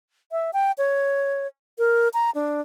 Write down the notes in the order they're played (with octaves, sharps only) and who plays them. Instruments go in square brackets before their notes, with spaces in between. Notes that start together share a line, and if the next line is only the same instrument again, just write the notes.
[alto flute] E5
G5
C#5
A#4
A#5
D4